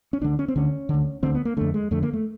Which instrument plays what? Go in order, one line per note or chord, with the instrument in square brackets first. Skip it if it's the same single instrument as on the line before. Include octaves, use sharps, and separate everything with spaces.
[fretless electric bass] C#4
D2 D3 D4
C#4
C4
D2 D3 C#4
D2 D3
D2 D3 C4
B3
A#3
F2 D3 A3
G#3
F2 D3 A3
A#3
A3